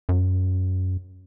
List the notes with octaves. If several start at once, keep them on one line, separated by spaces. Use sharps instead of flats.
F#2